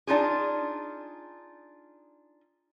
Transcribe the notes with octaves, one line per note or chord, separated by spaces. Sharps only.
D4 D#4 F4 G#4